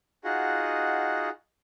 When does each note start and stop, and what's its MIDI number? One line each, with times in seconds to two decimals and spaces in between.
0.24 1.29 63
0.24 1.29 65
0.24 1.29 66
0.24 1.29 68
0.24 1.29 75
0.24 1.29 78